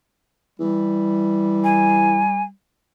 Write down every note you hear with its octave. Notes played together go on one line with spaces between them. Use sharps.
E3 G3
G#5